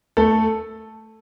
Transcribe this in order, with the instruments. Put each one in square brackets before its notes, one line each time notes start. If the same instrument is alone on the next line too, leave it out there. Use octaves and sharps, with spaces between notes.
[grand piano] A3 A4